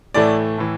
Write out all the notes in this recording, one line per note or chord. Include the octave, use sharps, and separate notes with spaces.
A2 E3 A3 D5
A2 E3